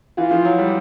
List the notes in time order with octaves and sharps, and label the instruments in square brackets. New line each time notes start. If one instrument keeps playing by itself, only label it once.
[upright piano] E3 [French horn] F4
[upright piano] F3
F#3
G3